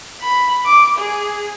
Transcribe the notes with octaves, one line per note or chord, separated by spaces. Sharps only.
B5
D6
G#4